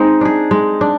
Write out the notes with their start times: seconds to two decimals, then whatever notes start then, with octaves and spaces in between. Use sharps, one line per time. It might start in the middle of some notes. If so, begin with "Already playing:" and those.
Already playing: G#3 C4 D#4
0.21 D4 G#4
0.51 G#3
0.81 D4